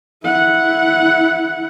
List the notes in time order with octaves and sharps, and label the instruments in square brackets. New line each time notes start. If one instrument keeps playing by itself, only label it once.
[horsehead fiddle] E4 F#5